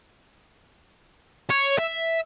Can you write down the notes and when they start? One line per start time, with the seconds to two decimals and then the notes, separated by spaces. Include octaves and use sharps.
1.50 C#5
1.78 E5